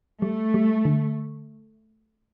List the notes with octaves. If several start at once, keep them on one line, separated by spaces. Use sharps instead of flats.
G3 A3
G3
D3